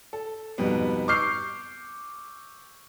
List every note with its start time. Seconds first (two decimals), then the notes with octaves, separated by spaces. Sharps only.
0.13 A4
0.58 F2 G#2 B2 G3 B3
1.08 C#6 D6 E6 F6 G6 C7